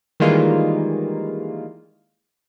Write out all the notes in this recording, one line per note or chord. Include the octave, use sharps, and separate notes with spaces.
D#3 E3 G3 G#3 A#3 F4